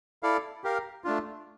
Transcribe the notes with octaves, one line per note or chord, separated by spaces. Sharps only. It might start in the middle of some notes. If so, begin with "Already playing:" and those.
E4 A4 D5 F5
G4 A#4 F5
A3 D4 F4